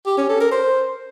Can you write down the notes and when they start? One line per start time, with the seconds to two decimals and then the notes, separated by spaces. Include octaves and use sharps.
0.06 G4
0.18 C#4
0.29 A4
0.40 A#4
0.52 C5